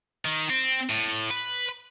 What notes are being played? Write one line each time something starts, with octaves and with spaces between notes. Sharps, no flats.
D#3
C4
A2
B4